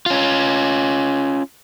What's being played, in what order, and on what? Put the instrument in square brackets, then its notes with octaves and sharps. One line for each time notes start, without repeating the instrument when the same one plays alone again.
[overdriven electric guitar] C#4 F4